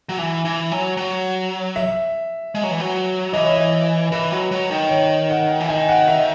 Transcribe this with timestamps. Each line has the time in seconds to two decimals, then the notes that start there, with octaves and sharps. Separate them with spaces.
0.09 F#3
0.19 E3
0.45 E3
0.71 F#3
0.97 F#3
1.76 E5
2.55 G#3
2.63 F#3
2.71 E3
2.80 F#3
3.33 E3 D#5
3.44 C#5
3.55 D#5
4.12 E3 B4
4.32 F#3
4.51 F#3
4.71 D#3
4.90 C#5
5.30 F#5
5.60 E3
5.69 D#3 G#5
5.89 F#5
6.08 E5